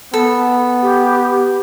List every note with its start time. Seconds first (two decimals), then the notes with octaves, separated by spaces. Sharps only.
0.14 B3 A4
0.82 G4